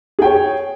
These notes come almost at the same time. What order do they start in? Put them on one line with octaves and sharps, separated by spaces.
G#4 G5 C#5